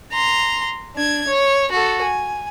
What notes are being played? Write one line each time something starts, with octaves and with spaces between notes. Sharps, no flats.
A#5 C6
D4 G#6
C#5
F#4 A4
G#5